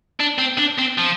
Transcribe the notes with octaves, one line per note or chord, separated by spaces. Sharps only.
D4
C4
D4
C4
F3